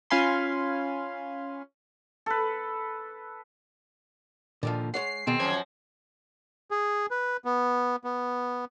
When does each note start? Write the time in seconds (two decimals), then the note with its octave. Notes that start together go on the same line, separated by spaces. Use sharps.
0.10 C#4 F4 F5 G#5 B5 C6
2.26 A4 B4
4.63 A#2 D3 D#3 F3
4.94 G#3 C#5 F#5 C7
5.27 B2 D#3 C4 G#4
5.39 F#2 F3 G#6
6.71 G#4
7.11 B4
7.45 B3
8.04 B3